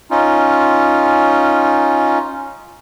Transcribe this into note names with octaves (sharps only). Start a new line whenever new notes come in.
C#4 D#4 F4